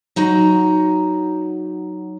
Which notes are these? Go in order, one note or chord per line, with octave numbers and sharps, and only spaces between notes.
F#3 D#4 F#4 A#5